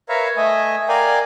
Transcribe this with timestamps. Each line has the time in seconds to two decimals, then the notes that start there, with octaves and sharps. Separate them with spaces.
0.09 A#4 B4 C#5 E5 F5 A#5
0.37 A3 D#5 E5 G#5
0.88 A#4 D5 F5 G5 G#5